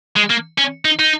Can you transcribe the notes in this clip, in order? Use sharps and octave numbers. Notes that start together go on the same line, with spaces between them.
G#3
A#3
C#4
D#4
D#4